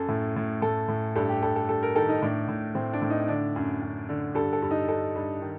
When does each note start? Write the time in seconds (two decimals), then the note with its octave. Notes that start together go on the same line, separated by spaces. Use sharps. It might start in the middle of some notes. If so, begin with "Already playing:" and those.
Already playing: F#2 A4
0.08 A2
0.36 A2
0.62 A2 A4
0.88 A2
1.16 G2 A4
1.29 G4
1.42 G2 A4
1.56 A4
1.68 G2 A4
1.83 A#4
1.95 D#3 A4
2.09 D#4
2.22 A2 D4
2.48 A2
2.75 A2 C4
2.93 D4
3.02 A2
3.10 D#4
3.28 D3 D4
3.56 F#2
3.82 F#2
4.09 D3
4.35 G2 A4
4.53 A4
4.62 G2
4.71 D#4
4.88 G2 A4
5.16 G2
5.42 D#3